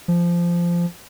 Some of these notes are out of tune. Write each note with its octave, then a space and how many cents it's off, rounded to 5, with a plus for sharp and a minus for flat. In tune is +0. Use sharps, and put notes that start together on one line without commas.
F3 -15